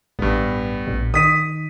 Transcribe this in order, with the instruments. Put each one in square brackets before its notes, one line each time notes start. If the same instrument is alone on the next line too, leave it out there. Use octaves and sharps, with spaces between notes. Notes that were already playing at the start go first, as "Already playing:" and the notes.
[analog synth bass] A1 [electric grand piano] G2 B3
[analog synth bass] A#1
[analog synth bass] D#3 [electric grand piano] D#6 B6 D#7